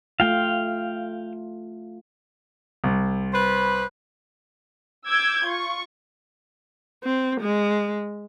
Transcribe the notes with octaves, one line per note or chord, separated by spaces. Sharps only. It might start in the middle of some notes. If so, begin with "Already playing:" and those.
A3 F4 F5 G5
C2
B4 C5 B5
D6 E6 G6 G#6
F4 C#6
C4
G#3